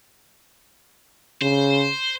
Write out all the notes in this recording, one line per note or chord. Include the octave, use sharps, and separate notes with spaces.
C#3 C5